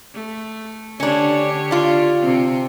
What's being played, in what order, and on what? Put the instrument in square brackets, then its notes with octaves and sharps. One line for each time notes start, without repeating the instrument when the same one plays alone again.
[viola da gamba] A3
[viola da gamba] D3 G4 C#5 [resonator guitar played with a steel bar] C#4 D4
[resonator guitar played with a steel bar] D4 F4
[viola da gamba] C3 C4